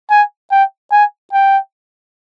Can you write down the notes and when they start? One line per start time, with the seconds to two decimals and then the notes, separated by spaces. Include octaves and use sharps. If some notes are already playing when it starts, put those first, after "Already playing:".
0.10 G#5
0.51 G5
0.92 G#5
1.33 G5